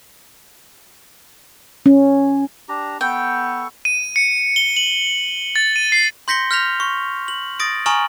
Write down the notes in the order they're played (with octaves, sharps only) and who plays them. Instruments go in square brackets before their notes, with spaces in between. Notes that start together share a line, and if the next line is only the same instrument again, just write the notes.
[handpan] C#4
[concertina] D4 G4 A#5
[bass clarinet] B3 [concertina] A4 C#6 [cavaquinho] G5
[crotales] D#7
C#7
G7
F#7
A6
D#7
C7
[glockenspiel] C6 G6 A#6 B6 C#7 G7
F6 G6 A#6 B6 F7
C#6
F#7
D#6 A6 A#6 D7
G#5 A#5 C#6 D#6 F6 F#7